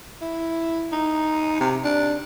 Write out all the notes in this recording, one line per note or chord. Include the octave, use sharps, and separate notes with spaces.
E4
D#4
C3
D4